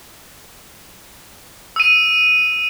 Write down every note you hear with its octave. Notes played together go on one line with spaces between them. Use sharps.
E6 D#7